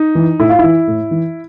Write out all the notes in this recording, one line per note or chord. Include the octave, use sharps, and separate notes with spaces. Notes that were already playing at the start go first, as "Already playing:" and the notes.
Already playing: D#4
E3
A2 E4
F4
E3 E4
A2
E3